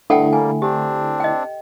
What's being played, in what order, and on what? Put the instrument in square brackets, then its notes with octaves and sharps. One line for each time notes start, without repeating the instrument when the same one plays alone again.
[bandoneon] G2 [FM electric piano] D3 A3 E4 [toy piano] A4 F#5 G5
[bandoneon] G3 A#3 [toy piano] G#5
[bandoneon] C4 D4 [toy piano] G4
[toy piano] D#5 G5